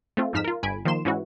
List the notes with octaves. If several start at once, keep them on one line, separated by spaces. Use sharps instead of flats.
A3 C4 F4
F2 G#2 D#4 F6 B6 E7
F4 A#4
G1 G#5 B5 D7
D#3 F3 A#3 C6 E7
G#2 E3 C#4 E4 F#4